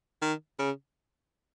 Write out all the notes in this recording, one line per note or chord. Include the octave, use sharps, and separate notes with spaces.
D#3
C#3